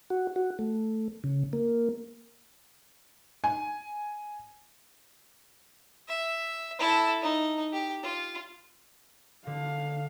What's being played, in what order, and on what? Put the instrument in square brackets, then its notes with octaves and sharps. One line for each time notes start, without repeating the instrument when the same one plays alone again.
[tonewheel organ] F#4
F#4
A3
C#3
A#3
[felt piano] G#5
[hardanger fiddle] E5
E4 A4
D#4
G4
F4
[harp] D3 [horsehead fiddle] F5